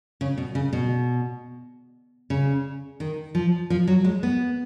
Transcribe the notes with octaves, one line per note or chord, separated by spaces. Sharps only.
C#3
B2
C#3
B2
C#3
D#3
F3
F3
F#3
G#3
B3